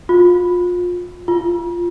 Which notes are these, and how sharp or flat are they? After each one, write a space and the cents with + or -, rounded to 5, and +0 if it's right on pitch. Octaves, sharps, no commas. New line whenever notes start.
F4 +30
F4 -10